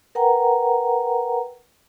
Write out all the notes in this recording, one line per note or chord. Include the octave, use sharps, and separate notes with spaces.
A#4 B4 F#5 G5 A#5